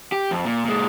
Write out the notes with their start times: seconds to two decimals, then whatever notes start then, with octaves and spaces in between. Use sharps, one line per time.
0.12 G4
0.31 F2
0.45 A#2
0.65 A#2 G#3